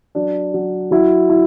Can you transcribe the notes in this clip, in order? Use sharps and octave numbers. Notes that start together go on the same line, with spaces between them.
F#3 D4
F#3
F#3 E4
E4